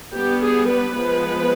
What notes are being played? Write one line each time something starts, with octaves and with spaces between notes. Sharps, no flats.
G3 B3 D4 G4
G#4
B4
F3 G#3 B3